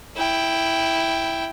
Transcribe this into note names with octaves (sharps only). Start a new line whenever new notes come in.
E4 G5